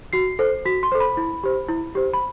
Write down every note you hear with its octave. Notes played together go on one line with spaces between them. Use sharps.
F#4 C7
A4 C5
F#4 B6
C6
A4 C5
B5
E4
G4 C5
E4
G4 C5
B5